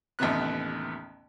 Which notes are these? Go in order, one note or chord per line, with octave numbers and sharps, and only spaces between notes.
A1 D#2 C3 B3 F#6